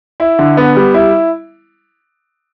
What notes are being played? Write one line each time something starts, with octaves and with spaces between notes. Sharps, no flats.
E4
D3
B3
G3
E4